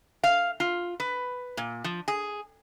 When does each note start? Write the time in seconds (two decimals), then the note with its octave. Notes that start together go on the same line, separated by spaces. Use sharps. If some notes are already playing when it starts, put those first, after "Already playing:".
0.24 F5
0.60 F4
1.00 B4
1.57 A#2
1.84 F3
2.08 G#4